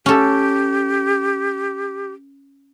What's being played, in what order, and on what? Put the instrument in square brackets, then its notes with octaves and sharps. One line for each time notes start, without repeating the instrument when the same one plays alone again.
[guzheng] C#4 A4 [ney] G4